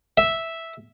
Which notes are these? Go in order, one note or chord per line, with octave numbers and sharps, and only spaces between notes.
E5